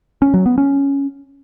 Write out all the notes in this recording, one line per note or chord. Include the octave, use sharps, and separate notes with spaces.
C#4
F#3
B3
C#4